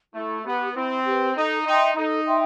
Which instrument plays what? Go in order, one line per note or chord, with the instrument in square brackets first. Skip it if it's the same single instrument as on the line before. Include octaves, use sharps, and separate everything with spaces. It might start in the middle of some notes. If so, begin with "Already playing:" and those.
[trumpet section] A3 [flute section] E4
[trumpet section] B3 [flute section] G4 B4
[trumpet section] C4 [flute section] E4
[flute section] G4 B4
[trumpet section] D#4 [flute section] A4
[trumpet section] D#4 [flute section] E5 G5 C6
[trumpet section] D#4 [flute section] A4
[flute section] E5 G5 C6